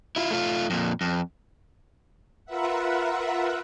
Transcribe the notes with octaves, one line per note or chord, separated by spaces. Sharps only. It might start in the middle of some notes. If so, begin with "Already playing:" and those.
E4 F4
A3 F4
F2 A#2
F2
F4 A#4 B4 E5 F#5